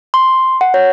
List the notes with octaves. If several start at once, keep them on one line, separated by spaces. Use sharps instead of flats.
C6
F#5
C#5